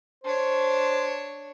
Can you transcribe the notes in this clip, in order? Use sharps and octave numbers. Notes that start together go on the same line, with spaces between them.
D4 C5 C#5